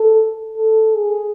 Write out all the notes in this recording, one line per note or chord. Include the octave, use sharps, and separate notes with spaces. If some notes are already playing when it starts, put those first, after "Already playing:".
Already playing: A4
A4
G#4